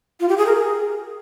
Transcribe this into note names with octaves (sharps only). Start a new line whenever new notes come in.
F4
G4
G#4
A#4
G#4